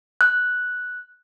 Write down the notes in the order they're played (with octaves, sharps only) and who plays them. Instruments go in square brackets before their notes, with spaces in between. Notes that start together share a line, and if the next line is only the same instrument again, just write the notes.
[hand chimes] F#6